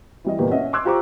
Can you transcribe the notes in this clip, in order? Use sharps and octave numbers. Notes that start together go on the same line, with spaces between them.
E3 G3 D#5
G1 E2 A#2 A#3 G4
C#4 D#5 E5 F#5
C6 D6 E6 F#6 G#6
F4 G4 C5 A#5 C#6 D6